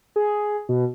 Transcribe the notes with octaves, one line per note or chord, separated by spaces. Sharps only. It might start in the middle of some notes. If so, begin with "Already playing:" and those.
G#4
B2